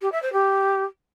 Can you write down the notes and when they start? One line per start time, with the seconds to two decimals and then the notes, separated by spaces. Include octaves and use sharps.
0.02 G4
0.12 E5
0.22 C5
0.33 G4